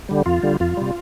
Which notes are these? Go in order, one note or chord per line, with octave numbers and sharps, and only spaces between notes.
D3 G3
F2 F4
D3 G3
F2 F4
C3 G3